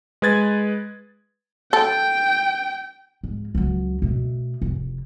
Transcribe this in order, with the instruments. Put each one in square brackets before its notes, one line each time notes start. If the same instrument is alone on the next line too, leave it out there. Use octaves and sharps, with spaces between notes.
[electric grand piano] G#3 B4 G#6 A6
[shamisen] A4 [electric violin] G5
[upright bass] G#2
C#2 F#3
B2 A3
F1